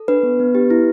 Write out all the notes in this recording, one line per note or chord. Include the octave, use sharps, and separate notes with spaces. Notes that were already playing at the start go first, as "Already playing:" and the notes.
Already playing: A4
D4 B4
B3
B3
G4
E4